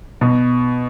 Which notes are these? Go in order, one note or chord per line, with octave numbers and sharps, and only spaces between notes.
B2